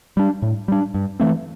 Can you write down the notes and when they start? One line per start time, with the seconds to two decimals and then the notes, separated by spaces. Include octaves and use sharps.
0.17 G3 D4
0.42 A2
0.68 G3 D4
0.94 G2
1.20 E3 A3 C4